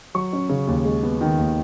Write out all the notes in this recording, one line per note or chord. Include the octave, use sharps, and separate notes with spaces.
F#3 C#6
C#4
C#3
D#2
G#3
B3
D#3
D#2